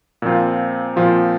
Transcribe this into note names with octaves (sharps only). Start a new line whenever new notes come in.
A#2 F3 C4 F4
A#2 F3 C4 F4